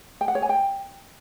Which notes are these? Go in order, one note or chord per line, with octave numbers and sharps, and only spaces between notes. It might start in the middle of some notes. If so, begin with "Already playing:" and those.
G5
F#5
C#5
G#5
G5